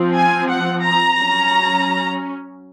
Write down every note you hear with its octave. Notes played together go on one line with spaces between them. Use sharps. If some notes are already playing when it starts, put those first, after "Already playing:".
Already playing: F3 C4
G#5
F#5
A#5
F#3 C#4